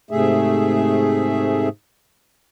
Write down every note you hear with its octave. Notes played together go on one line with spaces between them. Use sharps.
G#2 C3 A3 G#4 E5